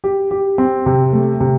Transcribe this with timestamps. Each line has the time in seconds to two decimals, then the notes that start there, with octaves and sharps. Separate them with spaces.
0.04 G4
0.31 G4
0.58 C4
0.86 C3
1.13 A3
1.40 C3